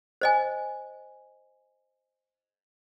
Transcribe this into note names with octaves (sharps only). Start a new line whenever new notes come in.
C5 D#5 G#5